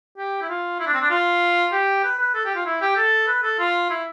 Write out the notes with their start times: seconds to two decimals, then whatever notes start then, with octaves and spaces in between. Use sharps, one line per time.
0.18 G4
0.42 E4
0.49 F4
0.80 E4
0.87 D4
0.94 C4
1.01 D4
1.11 F4
1.72 G4
2.04 B4
2.19 B4
2.35 A4
2.45 G4
2.55 F4
2.66 E4
2.82 G4
2.97 A4
3.28 B4
3.43 A4
3.59 F4
3.90 E4